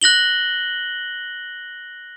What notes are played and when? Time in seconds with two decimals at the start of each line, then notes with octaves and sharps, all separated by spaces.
0.02 F#6 A#6 F#7 G7